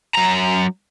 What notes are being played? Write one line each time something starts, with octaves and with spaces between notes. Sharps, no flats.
F#2 A#5